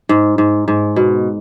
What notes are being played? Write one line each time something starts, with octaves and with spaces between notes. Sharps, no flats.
G#2
G#2
G#2
B2